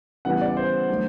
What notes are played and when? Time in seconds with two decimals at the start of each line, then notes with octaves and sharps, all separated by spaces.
0.25 C#3 E3 G3 B3 F#5
0.41 D5
0.57 C5
0.89 D#3 F#3 A3 D4